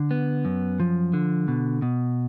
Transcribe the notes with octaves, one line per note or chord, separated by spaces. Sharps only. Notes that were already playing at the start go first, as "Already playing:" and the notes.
Already playing: D3
B3
F#2
F3
D3
B2
B2